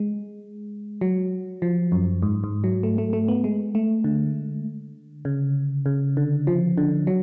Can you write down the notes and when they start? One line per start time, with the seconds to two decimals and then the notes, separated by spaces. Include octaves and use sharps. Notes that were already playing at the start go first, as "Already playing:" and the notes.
Already playing: G#3
1.01 F#3
1.62 F3
1.92 F#2
2.22 G#2
2.44 G#2
2.64 F#3
2.83 A3
2.98 A3
3.13 A3
3.28 B3
3.44 G#3
3.75 A3
4.04 D3
5.25 C#3
5.86 C#3
6.17 D3
6.47 F3
6.78 D3
7.07 F#3